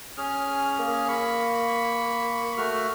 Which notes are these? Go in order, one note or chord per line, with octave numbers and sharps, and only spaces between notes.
C#4 G#4 F6
A#3
B5 C#6
A3 F#4 F6